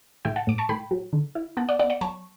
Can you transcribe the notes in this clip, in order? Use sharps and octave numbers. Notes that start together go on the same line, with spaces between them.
A2 E5 G5
F#5 A5
A2 D6
A5 C#6
A2 G5 B5
F#3
D3
E4
B3 F#5 A5
D5 F#5
B3 D5 F#5
D5 F#5
F#3 A5 C#6